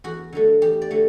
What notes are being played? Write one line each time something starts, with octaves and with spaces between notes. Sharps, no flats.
E2 F#4
D3 F#3 A3
E2 G4
D5
D3 F#3 A3